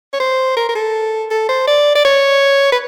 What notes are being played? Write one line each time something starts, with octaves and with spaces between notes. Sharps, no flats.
C#5
C5
A#4
A#4
A4
A4
C5
D5
D5
C#5
B4